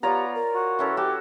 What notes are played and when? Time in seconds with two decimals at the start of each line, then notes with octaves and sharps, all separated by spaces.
0.03 B3 F4 G4 C#5 D5 A#5
0.34 A#4
0.55 F#4
0.79 E3 C#4 A4
0.97 F#4 G4 A4